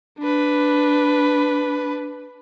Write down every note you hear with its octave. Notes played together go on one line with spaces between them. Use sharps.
D4 B4